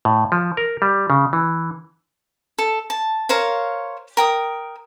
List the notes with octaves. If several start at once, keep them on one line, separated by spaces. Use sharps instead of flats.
A2
F3
A#4
G3
C#3
E3
A4
A5
A#4 C5 C#5 F5
A#4 G5 D#6